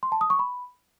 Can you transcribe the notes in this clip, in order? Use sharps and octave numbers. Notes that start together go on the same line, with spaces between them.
C6
A5
D#6
C#6
B5